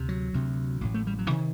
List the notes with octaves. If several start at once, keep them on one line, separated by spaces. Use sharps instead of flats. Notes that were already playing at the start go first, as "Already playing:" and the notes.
Already playing: D2 C3
F#3
D2 C3
A1 A2
A3
G3
F#3
C3 D#3